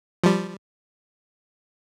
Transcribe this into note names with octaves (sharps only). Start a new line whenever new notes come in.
F3 G3